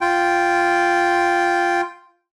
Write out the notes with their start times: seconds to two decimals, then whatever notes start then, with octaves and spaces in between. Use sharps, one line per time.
0.01 F4 G5